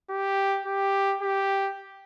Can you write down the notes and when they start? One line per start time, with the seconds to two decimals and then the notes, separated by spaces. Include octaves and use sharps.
0.10 G4
0.66 G4
1.21 G4